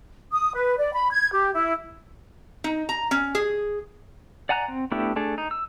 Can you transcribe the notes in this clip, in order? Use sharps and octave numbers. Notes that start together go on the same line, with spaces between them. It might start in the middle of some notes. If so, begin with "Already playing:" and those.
D#6
B4
D5
B5
G#6
G4
E4
D#4
A#5
C#4
G#4
D5 F#5 G#5 A#5 F#6
C4
A3 B3 D4 E4 G4
A3 D4 G#4 A4
D#4
E6